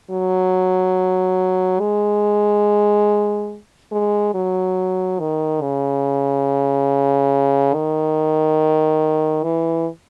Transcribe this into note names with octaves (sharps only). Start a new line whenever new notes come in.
F#3
G#3
G#3
F#3
D#3
C#3
D#3
E3